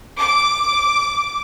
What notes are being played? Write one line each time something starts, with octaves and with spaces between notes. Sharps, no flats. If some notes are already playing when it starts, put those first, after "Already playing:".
D6